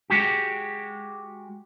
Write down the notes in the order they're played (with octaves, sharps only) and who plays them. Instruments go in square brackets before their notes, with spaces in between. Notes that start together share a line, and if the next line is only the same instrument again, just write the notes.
[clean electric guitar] G#3 F#4 G4